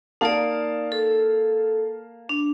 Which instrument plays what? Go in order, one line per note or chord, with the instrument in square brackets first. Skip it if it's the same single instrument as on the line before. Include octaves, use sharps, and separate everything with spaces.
[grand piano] A#3 F5 A5 [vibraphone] D#4 D5
[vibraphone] A4
D4